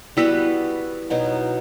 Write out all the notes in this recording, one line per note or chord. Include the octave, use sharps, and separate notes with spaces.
G3 B3 E4 F#4 B4
B2 F#3 B3 D#4